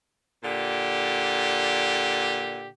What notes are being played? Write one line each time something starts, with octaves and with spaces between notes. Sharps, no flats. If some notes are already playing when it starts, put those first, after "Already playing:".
A#2 D3 G4